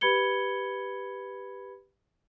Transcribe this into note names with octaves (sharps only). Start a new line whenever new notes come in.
G4 B4 B5 G#6 C#7 G7